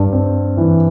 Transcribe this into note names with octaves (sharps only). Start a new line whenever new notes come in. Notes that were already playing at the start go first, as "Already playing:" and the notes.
Already playing: G2
C4
E3